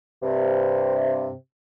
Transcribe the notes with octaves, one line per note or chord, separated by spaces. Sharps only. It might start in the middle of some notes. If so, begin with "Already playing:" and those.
G2 C3